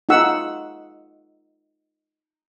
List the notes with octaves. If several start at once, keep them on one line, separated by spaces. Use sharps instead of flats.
D#4 F4 G#4 F#5 E6